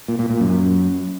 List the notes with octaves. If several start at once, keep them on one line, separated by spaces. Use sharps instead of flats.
A#2
A#2
A#2
F#2